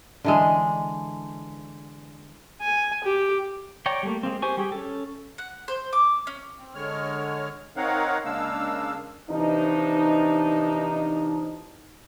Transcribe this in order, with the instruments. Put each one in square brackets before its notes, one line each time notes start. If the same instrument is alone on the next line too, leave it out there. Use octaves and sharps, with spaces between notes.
[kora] D3 E3 G#3
[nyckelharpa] G#5
G4
[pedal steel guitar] C#5 D5 G5 A#5
G3 A3 A#3
G#3 A#3 C4
G4 C5 G#5 C#6
G3 G4 G#4
C#4 A4
[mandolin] F#5
C5
D6
C#4
[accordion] C4
D3 G#3 C#5 F6
C4 D#4 A#4 C#5 F5 F#5
C#3 G#3 A#3 D4 F5 E6
[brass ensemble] C3 E3 F3 D4 D#4